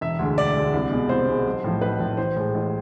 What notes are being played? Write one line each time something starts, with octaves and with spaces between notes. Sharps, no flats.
E1 E5
D2 D3 G#3
E1 D5
D2 D3 G#3
C2
B2 G#3
C2 C5
B2 G#3
B1
A2 F3
B1 B4
A2 F3
A1 C5
A2 G#3
A1